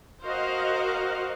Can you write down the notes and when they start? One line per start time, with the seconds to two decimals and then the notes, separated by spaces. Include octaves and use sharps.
0.23 F#4 A#4 C5 D#5 F5